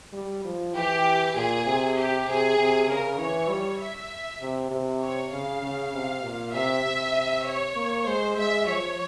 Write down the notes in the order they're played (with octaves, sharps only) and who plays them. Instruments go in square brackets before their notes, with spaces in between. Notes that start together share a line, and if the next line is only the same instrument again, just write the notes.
[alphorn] G3
F3
[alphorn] E3 [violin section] G4
[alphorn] A#2 [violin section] G#4
[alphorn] C3
[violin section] G4
[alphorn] C3 [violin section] G#4
[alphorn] C3
[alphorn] C#3 [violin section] A#4
[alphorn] E3 [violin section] C#5
[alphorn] G3
[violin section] E5
[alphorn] C3
C3
[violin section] C#5
[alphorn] C#3 [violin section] F5
[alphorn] C#3
C3
A#2
[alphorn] C3 [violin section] E5
[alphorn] C3
[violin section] C#5
[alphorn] A#3
[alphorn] G#3 [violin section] C5
[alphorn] G#3 [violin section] E5
[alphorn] F3 [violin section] C#5